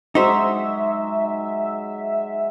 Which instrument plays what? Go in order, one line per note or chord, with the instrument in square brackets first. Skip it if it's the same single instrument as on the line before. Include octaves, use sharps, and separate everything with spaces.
[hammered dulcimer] F#3 G#3 [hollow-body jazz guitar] D#4 C5 [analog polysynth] E5